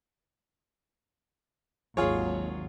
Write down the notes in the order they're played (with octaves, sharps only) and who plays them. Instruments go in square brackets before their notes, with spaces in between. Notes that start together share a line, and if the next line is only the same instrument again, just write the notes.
[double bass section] G#1 D#2 F#3 [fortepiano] F4 G#4 C#5